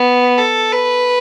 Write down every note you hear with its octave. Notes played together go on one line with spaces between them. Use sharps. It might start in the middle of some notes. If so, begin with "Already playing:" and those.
Already playing: B3
A4
B4